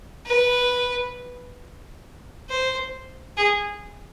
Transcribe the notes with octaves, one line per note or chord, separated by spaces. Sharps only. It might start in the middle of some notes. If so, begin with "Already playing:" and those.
B4
C5
G#4